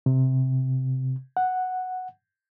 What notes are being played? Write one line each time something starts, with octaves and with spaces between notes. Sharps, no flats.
C3
F#5